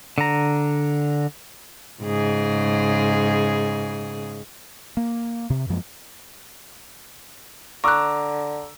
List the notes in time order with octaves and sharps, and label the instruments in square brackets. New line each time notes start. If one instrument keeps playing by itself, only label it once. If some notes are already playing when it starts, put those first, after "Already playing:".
[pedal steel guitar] D3 A#5
[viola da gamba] G#2 C#3 G#4
[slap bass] A#3
C3
F#2 F3 G#3 A#3
[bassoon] D3 [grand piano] A#5 D6 E6 [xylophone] C#6 F#6